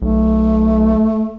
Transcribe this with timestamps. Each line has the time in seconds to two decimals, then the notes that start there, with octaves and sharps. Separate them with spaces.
0.02 B1 A3